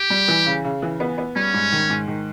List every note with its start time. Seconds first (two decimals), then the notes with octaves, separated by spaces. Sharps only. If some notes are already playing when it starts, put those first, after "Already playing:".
Already playing: G4
0.10 G3
0.28 E3
0.46 C#3
0.65 C#3
0.82 E3
1.00 B3
1.18 B3
1.36 G3 C#4
1.54 G#2
1.72 D#3
1.90 G#2
2.08 D#3